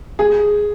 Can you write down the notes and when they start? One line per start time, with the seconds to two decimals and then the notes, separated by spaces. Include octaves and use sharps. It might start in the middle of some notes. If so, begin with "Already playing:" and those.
0.19 G#4